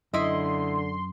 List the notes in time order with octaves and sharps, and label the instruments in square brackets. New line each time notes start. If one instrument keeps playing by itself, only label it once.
[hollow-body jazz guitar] F#2 [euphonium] D3 [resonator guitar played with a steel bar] E4 D#5 [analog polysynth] C6